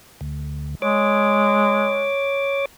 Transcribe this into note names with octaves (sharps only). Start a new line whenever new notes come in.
D2
G#3 C#5 D6